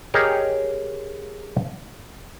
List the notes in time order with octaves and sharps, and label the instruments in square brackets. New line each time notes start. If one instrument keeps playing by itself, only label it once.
[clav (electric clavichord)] G4 G#4 A#4 C#5 D#5